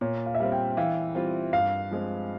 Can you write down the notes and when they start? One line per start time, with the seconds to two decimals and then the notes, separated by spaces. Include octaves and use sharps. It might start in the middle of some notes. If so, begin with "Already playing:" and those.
0.01 A#2 C#5
0.26 F5
0.35 E5
0.40 G3 C4 F5
0.52 G5
0.77 E3 F5
1.15 G3 C4 F4
1.53 G2 F5
1.91 F3 G#3 C4